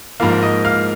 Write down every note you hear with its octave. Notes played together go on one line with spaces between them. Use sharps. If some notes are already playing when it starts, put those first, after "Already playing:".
G#2 F3 A#3 F5 F6
D#5 D#6
F5 F6